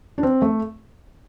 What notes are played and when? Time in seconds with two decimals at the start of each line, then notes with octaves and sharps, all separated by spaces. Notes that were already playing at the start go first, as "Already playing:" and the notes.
0.18 D4
0.23 C4
0.42 A3